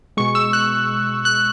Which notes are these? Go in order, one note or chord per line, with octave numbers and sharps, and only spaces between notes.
B2 G#3 C#6
E6
F#6
F#6